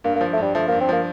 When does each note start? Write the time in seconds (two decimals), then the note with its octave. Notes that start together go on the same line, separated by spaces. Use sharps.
0.04 G2 A#3
0.16 A#3
0.21 F3
0.33 A3
0.38 G2 G3
0.55 F3 A3
0.68 A#3
0.72 G2
0.80 C4
0.89 F3 A#3